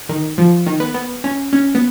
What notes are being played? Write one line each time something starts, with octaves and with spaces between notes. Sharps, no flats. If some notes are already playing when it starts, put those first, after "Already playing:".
D#3
F3
D#3
B3
B3
C#4
C#4
B3